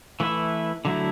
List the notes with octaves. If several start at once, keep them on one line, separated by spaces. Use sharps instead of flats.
E3 A3 E4 B4 E5
D3 F#3 A3 E4